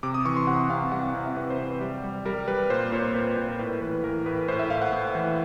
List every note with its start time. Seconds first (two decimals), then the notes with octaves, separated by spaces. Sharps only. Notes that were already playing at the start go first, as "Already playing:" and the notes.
0.03 C3 D6
0.14 D#6
0.25 E3 C#6
0.36 C6
0.47 C3 F#5
0.70 C3 F5
0.92 G3 F#5
1.03 F5
1.14 C3 F5
1.26 E5
1.37 C3 B4
1.50 C5
1.59 C3 B4
1.81 G3
2.04 G3
2.25 G3 A#4
2.48 G3 B4
2.70 A#2 C5
2.92 A#2 C#5
3.14 A#2 B4
3.26 A#4
3.37 A#2 C5
3.48 A#4
3.59 A2 B4
3.81 E3 B4
4.04 E3 A#4
4.26 A2 B4
4.48 A2 C5
4.59 E5
4.70 A2 F5
4.81 F#5
4.93 A2
5.15 E3